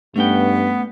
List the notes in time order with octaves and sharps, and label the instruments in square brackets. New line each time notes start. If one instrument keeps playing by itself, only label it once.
[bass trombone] G2 [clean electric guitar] A3 C#4 G5 [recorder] B3